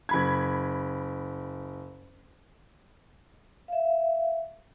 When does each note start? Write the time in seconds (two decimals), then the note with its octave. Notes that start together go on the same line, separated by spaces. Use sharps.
0.09 F#1 B5 G#6
3.68 E5 F5